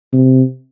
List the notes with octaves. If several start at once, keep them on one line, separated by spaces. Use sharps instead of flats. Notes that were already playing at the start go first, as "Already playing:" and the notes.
C3